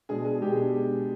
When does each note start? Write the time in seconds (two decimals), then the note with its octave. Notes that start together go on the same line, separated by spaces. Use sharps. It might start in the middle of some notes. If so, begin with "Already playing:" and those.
0.09 B2 G#3 D4 G#4
0.25 G#4
0.41 B2 G#3 D4 G4
0.53 G#4